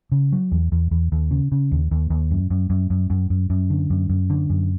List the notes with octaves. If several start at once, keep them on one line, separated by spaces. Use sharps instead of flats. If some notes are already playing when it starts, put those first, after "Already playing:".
C#3
F#3
E2
E2
E2
D#2
C#3
C#3
D#2
D#2
D#2
F#2
F#2
F#2
F#2
F#2
F#2
F#2
D3
F#2
F#2
D3
F#2